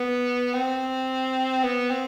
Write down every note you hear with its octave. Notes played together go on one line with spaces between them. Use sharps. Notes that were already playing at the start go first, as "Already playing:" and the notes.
Already playing: B3
C4
B3
C4